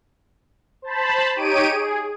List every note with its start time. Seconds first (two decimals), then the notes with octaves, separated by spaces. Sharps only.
0.82 C5 A5 B5
1.36 D#4 G4 C#5 D7 D#7
1.68 G#4